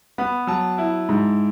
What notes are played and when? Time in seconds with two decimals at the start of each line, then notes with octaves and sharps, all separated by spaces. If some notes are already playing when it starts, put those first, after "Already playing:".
0.18 B3 B5
0.47 F#3 A5
0.78 E4
1.09 G#2